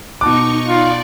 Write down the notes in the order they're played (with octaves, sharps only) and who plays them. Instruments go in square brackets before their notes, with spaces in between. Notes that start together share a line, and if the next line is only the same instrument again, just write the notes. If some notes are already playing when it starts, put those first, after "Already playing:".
[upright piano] B2 A5 F#6 [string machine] D#4 C#6 [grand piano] D6
[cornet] F4 [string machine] D5